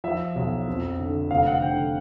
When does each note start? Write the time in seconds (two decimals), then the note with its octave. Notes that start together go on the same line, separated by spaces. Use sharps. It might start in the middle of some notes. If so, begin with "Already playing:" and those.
0.04 F3 E5
0.36 B1
0.67 F2
0.99 D3
1.30 F1 F5
1.47 F#5
1.62 D3 G5